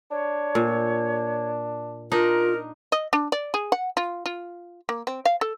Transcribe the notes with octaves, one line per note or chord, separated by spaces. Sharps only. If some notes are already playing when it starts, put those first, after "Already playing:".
D4 C#5
A#2
D4 D#4 F4 A#4
D#5
D4
D5
G#4
F#5
F4
F4
A#3
C4
F5
A4